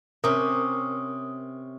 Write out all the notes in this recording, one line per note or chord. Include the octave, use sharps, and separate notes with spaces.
C3 C#4 A#4 D#6